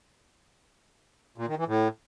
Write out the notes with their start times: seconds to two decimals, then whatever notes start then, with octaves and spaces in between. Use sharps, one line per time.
1.38 A#2
1.48 D#3
1.58 E3
1.68 A2